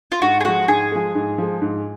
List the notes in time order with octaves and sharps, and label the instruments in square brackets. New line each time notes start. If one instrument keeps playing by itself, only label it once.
[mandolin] F4
[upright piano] G#2 [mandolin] F#4
[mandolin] G#4
[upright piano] F3 G#3 [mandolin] F#4
[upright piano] G#2 [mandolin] G#4
[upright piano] F3 G#3
G#2
F3 G#3
G#2